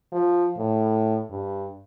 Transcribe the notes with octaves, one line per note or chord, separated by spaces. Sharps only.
F3
A2
G2